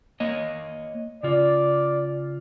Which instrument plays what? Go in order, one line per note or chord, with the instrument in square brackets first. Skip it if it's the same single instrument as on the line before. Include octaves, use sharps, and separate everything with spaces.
[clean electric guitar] A#3 C#5 D#5
[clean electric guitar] C#3 F4 [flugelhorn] D5